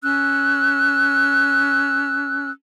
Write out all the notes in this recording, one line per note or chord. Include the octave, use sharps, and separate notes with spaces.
C#4 E6 F#6